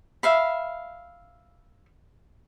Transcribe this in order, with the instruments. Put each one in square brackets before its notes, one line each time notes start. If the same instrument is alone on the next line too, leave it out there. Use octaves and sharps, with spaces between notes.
[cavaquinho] E5 F5 B5